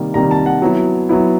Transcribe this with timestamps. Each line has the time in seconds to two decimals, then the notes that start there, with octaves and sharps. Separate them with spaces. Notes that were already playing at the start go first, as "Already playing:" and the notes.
Already playing: C3 D#3 G3 A#3
0.14 C3 D#3 G3 A#3 A#5
0.31 A5
0.46 F#5
0.62 F#3 B3 E4
1.09 F#3 B3 E4